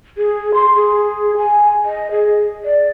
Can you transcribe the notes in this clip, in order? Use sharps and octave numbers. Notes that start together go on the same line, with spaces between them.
G#4
C6
G#4
G#5
D#5
G#4
D5